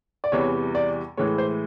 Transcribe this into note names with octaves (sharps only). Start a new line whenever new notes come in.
D5
E2 C3 E3 G3 C#5
D5
A2 E3 G#3 C#5
C5